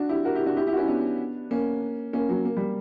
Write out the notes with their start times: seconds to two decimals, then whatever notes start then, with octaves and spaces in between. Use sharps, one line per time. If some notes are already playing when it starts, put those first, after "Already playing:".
Already playing: D4 F#4
0.09 E4 G4
0.25 F#4 A#4
0.35 E4 G4
0.46 D4 F#4
0.57 E4 G4
0.67 E4 G4
0.73 F#4
0.77 C#4 E4
0.88 B3 D4
1.51 A#3 C#4
2.13 A#3 C#4
2.29 F#3 A#3
2.45 A#3
2.57 G3